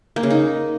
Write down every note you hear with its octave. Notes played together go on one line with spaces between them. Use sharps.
A#3
C#3
D#4